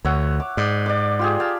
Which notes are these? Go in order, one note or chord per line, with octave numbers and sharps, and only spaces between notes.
D2 C#5 E5 F#5
D6
G#2 D5
D5 D6
F4 G4 G#4
F5 G5 A5